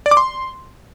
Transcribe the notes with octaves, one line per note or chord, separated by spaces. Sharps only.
D5
D6
C6